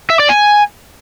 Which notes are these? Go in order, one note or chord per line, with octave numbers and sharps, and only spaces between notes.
E5
D5
G#5